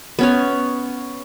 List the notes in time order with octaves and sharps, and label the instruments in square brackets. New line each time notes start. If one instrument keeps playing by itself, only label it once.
[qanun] B3 C#4 C#5